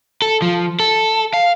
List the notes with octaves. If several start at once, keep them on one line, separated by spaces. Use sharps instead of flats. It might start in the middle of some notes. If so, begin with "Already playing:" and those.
A4
F3
A4
F5